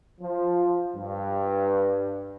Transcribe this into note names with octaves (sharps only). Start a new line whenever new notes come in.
F3
G2